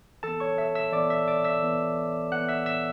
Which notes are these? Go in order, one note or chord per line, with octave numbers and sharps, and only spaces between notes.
E3 B3 A4 A5
C#5 C#6
E5 E6
E5 E6
E3 B3 D5 D6
E5 E6
D5 D6
E5 E6
E3 B3
E3 B3 F#5 F#6
E5 E6
E5 E6